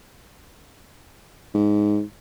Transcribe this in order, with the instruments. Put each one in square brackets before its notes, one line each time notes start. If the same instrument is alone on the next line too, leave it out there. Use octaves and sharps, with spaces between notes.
[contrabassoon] G#2